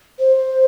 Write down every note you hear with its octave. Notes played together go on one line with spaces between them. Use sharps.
C5